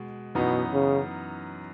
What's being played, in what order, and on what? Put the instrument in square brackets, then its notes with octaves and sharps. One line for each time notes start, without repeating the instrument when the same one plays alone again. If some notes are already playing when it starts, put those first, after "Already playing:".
Already playing: [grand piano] B2 G#3
[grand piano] F#2 E3 B3 D#4 [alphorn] B2
[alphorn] C#3